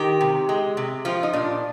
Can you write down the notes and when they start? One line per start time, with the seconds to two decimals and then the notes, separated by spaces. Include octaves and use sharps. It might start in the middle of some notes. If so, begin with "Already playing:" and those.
Already playing: D#3 G4
0.21 C3
0.49 G#3
0.77 C3
1.05 F3 F4
1.23 D#4
1.33 A#2 D4